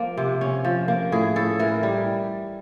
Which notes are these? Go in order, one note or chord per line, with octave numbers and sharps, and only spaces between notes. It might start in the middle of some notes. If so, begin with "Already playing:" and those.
Already playing: F3 A#3
C3
C#4
F3
A#3
A2 G#4
A2 A4
E3 A#4
G3